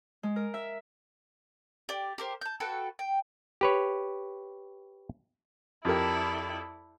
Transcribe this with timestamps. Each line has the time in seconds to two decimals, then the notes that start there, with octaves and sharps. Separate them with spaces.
0.23 G#3
0.36 A#4
0.54 E5
1.89 G4 D5
2.18 G4 A#4 C5
2.41 A5 G6
2.60 F#4 A4 B4 G5
2.99 G5
3.61 G4 B4 C#5
5.85 F2 E4 G4 A4 A#4 D5